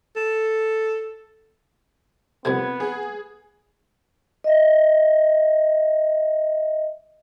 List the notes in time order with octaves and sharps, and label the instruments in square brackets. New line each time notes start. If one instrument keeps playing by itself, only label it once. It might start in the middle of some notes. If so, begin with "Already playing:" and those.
[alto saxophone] A4
[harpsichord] C2 F2 C3 [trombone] B3 [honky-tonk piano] G#6
[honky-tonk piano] G#4
[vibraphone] D#5 E5